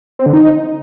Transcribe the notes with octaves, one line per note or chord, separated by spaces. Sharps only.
C4
D3
D#4